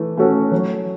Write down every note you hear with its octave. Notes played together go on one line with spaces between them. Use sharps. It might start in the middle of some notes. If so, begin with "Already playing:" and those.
Already playing: E3 A3
A3 C#4 F#4 A4
F#3